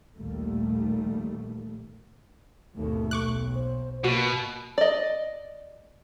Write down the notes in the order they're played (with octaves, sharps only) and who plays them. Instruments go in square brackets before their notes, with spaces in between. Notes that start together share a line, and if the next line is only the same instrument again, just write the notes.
[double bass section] A#1 D#2 A#2 D#3 G3 A3
[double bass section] G#1 D#2 B2 [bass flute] A3
[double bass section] B1 [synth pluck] C#6 D6 F#6
[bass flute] C5
[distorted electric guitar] B2 [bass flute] A#3 [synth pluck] F#4
[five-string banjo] D5 D#5